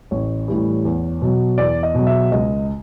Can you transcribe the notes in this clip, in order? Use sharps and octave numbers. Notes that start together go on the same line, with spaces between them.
A1 C#5
A2 E3 G3
E2
B2 F#3
E2 D5
D#5
B2 F#3
E5
C#2 D#5